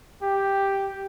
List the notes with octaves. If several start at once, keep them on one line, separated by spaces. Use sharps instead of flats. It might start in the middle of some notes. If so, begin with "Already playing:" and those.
G4